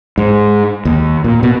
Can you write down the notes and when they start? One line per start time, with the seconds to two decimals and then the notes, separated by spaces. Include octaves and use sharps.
0.18 G#2
0.85 D#2
1.24 A#2
1.43 B2